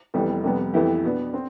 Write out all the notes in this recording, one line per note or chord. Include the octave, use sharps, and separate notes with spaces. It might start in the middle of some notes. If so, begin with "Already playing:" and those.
F1 F2 E3 G3 B3
F2 C3 G3 B3
F2 E3 B3 E4 G4
B2 B3 D4
C4